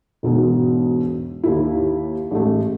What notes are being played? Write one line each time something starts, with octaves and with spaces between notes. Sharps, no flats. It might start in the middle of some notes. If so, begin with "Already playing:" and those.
E1 G#2 B2
D#2 E4
A1 G#3 A3